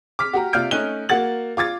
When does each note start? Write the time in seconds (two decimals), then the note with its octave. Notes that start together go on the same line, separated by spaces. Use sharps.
0.19 D6 F6 B6
0.33 F#4 G4 A#5
0.53 C3 F4 D5 F6 G6 D7
0.71 A3 C#4 D#4 F#6 D#7 G7
1.09 A#3 F#4 F#5 A6 F#7
1.57 F4 D6 G#6 A6